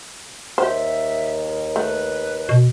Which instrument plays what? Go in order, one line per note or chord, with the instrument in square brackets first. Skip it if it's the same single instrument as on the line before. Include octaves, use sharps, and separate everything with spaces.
[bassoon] D#2 [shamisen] G4 C5 [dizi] E5
[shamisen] A3 [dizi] B4
[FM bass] B2